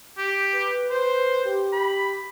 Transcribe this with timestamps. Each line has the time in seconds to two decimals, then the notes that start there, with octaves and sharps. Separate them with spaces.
0.18 G4
0.53 B4
0.90 B4 C5
1.44 G4
1.73 B5